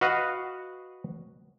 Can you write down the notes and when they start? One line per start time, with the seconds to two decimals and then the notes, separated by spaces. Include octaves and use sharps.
0.01 F#4 B4 D#5 F5 F#5